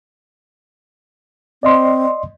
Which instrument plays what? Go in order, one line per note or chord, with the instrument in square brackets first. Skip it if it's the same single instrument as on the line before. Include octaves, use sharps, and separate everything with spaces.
[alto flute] C4 [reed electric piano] D5 D#5 C6